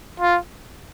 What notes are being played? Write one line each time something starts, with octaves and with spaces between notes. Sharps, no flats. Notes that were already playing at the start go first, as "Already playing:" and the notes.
F4